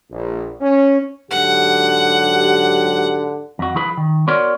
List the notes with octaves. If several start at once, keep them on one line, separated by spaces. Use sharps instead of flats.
A#1
C#4
G#2 D3 F#3 G4 F#5
F2 F#4
F3 E4 G#4 B4 B5
D#3
B3 F#4 A#4 C#5 D5 C6